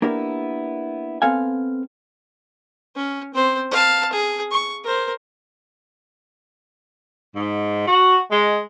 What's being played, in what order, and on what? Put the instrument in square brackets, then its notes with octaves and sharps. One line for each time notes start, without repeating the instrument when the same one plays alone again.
[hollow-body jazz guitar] A#3 B3 D4 E4 G4 A#4
B3 C4 A4 F5 G#5
[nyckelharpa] C#4
C4 C5
F5 A5
G#4
C#6
A#4 C5
[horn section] G#2
F#4
G#3